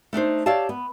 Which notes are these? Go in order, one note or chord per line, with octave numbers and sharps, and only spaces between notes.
A3 D4 D#4 C5
G4 C#5 D5 E5 F5 A5
B3